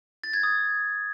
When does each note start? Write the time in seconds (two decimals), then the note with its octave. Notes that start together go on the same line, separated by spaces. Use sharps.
0.24 A6
0.33 G#6
0.43 D#6